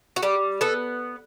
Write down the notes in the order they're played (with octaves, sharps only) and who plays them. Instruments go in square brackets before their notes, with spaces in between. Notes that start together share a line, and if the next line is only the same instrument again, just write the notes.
[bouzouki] F#4
G3 G4
B3 A4